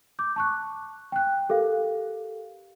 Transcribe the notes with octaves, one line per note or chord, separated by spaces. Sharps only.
D6 G6
A5 C#6 F#6
G5 F#6
G4 A4 A#4 F5